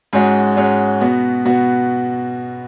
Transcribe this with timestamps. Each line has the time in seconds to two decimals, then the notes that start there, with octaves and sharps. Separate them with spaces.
0.13 G#2 G#3 C#4 F#4
0.57 G#2 G#3 C#4 F#4
1.01 B2 B3 F#4
1.45 B2 B3 F#4